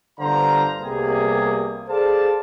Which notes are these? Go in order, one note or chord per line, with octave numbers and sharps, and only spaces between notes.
G1 G2 D3 C5 F5 A#5
C2 C3 G3 A#3 B3 G#4
G#4 A4 C5 D5 F5 A5